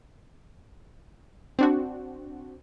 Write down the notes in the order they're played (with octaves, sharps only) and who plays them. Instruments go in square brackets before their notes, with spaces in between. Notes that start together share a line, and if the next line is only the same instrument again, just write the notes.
[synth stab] C4 D4 F#4